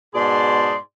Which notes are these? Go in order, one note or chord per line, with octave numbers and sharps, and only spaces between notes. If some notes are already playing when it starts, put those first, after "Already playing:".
G#2 B2 G#4 D5 A5 C6